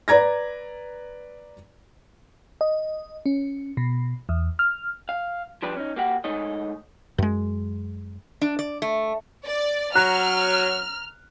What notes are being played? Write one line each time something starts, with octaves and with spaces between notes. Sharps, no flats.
B4 D5 A#5 G#6 A#6
D#5
C#4
B2
E2
F6
F5
F3 G3 D4 B4 D5
C#4 D#4
A#3 F#4 G4 F5 F#5
G#2 A3 D#4 C#5 D#5
F#2 G#3
D4
D5
A3
D5
F#3 A#5 F6 F#6